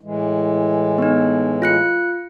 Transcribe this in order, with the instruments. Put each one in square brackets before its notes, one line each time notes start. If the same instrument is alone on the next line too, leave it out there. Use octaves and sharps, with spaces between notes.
[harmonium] A2 E3 G#3
[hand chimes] B3 D#4
F4 F#6 C#7